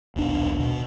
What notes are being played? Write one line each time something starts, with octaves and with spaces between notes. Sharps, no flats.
D#1 B1 D4
B2